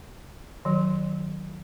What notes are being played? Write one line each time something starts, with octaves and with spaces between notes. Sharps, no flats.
D#3 F#3